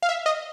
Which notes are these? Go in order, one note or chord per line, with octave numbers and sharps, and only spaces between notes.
F5
E5
D#5